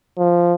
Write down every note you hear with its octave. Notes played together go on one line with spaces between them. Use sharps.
F3